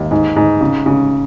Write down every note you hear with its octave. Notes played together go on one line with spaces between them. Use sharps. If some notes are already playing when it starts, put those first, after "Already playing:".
Already playing: D#2
G#2
G#2
C#3
C#3